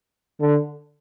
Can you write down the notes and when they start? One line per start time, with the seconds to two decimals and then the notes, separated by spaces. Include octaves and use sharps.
0.40 D3